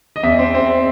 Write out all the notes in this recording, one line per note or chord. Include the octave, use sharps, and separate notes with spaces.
D#5
E2 E5
C4
C4